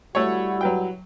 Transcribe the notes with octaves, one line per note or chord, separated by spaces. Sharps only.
G3 A3 E4 F#4 C#5
F#3 B4 G5